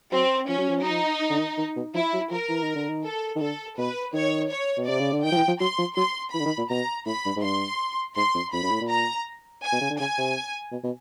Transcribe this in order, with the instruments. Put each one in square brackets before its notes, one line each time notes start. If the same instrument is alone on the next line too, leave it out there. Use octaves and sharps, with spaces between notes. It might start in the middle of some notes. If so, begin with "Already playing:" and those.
[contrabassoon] F#3 [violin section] C4
[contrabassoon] F3 [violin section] C#4
[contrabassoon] F#3
F3
[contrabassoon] F#3 [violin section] D#4
[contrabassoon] F3
D3
D#3
D#3
B2
[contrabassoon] F3 [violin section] E4
[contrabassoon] F#3
[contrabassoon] F3 [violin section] A#4
[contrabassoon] E3
D#3
D3
D#3
[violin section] A4
[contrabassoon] D#3
[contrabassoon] D3 [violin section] A4
[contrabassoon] B2 [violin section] B4
[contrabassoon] D#3 [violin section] C#5
[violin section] C#5
[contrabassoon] B2
[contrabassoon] C3 [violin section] D5
[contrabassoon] C#3
D3
[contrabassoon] D#3 [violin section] G5
[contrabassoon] F3
E3
F3
[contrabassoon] F#3 [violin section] C6
[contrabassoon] F3
[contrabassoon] F#3 [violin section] C6
[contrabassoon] E3 [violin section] B5
[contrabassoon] D3
D#3
A#2
[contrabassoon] B2 [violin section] A#5
[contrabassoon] A2 [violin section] B5
[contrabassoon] G2
G#2
[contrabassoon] G2 [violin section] C6
[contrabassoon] G#2 [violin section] C6
[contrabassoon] F2
[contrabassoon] F2 [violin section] B5
[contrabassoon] F#2
A2
A#2
[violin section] A#5
G#5
[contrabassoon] B2
C#3
D3
[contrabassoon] C#3 [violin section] G#5
[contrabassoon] C3
B2
B2